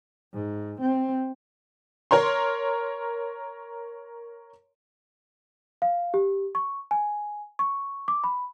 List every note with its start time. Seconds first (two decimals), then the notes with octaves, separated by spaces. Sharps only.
0.34 G#2
0.81 C4
2.11 A#4 C#5 A#5 C6
5.82 F5
6.14 G4
6.55 C#6
6.91 G#5
7.59 C#6
8.08 D6
8.24 B5